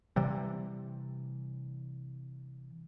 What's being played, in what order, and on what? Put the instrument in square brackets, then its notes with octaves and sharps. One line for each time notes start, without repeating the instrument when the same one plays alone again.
[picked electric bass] C3 E3 G3